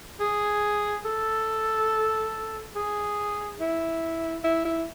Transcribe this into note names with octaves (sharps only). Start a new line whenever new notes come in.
G#4
A4
G#4
E4
E4
E4